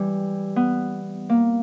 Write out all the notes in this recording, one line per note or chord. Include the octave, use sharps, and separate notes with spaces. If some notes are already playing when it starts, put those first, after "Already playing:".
Already playing: E3 G3
B3
A#3